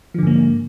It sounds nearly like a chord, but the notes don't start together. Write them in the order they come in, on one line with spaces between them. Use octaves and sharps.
F3 D3 G#2 A#3